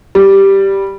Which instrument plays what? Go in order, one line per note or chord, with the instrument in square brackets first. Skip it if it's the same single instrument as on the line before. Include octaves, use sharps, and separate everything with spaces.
[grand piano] G3